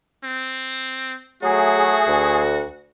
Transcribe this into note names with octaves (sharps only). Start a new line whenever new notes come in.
C4
F#3 A3 F#4 G#4
D2